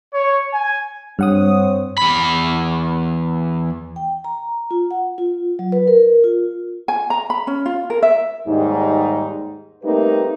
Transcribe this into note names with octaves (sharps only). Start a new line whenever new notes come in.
C#5
G#5
G2 C4 C#5 F#5 D#6
E2 B5
G5
A#5
F4
F#5
F4
F#3
B4
A#4
F4
G#5
A#5
B5
C#4
F4
A#4
E5
D#2 G#2 G3 D#4
G3 A3 A#3 C4 D#4 B4